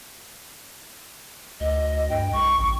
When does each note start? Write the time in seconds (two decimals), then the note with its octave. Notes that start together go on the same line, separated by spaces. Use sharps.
1.60 D2 D#5
2.10 G2 G5
2.33 C2 C#6
2.57 A1